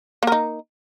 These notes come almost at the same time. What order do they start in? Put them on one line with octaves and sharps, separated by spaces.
A#3 A#4 D#4